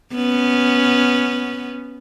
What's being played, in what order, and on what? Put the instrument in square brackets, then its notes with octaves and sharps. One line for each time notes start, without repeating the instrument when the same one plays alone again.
[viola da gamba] B3 C#4